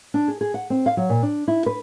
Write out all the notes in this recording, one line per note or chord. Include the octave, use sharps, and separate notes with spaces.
D4
G#4
G#4
F#5
C4
F5
F#3
A#2
D4
E4
B4